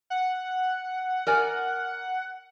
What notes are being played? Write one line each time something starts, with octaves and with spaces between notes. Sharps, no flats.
F#5
A#4 D5 G#5